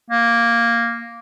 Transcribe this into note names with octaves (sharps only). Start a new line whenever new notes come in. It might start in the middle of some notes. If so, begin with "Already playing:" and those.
A#3